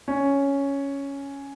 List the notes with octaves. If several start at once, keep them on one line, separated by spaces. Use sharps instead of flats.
C#4